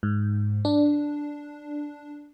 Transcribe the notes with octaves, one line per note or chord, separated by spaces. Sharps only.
G#2
D4